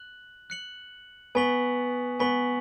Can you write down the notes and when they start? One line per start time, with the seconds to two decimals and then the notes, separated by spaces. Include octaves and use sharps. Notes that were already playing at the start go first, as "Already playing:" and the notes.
Already playing: F#6 F#7
0.50 F#6 C#7 F#7
1.35 B3 G#5 C#6 B6 F#7
2.20 B3 G#5 C#6 B6 F#7